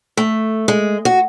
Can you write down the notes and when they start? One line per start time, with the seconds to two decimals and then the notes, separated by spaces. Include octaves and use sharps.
0.17 A3
0.68 G#3
1.05 F#4